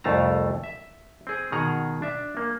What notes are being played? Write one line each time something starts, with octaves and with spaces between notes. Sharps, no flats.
C2 F2 A3 F4 A5 A#5
E5
C4 G#4
B2 D#3 G#4 F#5 A#5
D4 E5
A#3